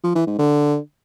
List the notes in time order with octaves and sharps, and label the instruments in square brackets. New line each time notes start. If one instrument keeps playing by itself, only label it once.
[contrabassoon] F3
E3
G#2
D3